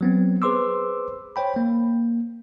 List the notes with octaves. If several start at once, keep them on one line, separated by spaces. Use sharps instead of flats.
F#3 B3 C4
G#4 B4 C5 C6 D6 E6
C5 C#5 G5 B5
A#3